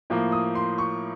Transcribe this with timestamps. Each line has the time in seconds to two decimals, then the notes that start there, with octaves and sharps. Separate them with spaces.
0.10 A2 F3 A#3
0.32 D#6
0.55 C6
0.78 C#6